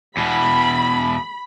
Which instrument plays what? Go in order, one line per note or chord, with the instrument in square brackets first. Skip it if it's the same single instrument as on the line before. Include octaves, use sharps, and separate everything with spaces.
[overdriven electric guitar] E2 B2 [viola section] B5